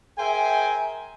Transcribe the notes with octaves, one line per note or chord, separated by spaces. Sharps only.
G#4 A#4 C5 E5 G5 G#5